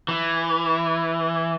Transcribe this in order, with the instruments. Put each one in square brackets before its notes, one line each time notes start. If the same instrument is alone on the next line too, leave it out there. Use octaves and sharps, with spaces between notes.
[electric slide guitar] E3